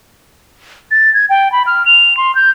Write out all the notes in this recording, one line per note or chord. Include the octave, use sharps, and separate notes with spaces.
A6
G#6
G5
B5
F6
F7
C6
G6